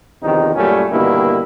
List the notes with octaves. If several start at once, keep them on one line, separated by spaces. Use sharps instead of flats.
E2 C3 D#3 F3 D4 D#4
F#2 A#2 G3 A3 C#4
G2 B2 D3 D#3 A#3 E4